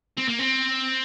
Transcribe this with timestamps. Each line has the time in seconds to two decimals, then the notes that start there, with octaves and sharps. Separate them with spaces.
0.18 C4
0.29 A#3
0.39 C4